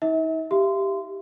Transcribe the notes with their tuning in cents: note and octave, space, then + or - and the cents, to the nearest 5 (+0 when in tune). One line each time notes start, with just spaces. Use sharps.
D#4 +40 E5 -40
G4 +0 E5 +45 C6 -20